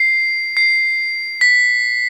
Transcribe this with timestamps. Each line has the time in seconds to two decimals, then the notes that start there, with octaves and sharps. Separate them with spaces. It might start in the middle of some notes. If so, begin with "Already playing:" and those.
Already playing: C7
0.57 C7
1.41 B6